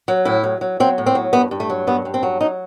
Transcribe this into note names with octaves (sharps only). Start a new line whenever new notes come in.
F#3
A2 E4
F#3
F#3
F#3 C4
A2
C4
F#3
G2 B3
G2
A3
F#3
G2 B3
G2
C4
F#3
F#3 D#4